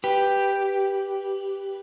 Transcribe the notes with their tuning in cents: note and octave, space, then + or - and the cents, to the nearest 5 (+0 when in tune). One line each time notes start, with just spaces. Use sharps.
G4 +0 B4 +0